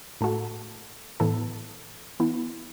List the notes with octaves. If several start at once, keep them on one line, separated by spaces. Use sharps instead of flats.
A2 A3 F#4 A4
A2 E3 B3 E4 A4
E3 B3 E4